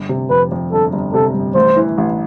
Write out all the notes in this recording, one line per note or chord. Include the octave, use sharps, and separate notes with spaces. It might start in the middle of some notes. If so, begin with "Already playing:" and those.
Already playing: G1
C3
F2 B4
F2
G1 A4
G1
C3 A4
G1
A1 C5
E3
A1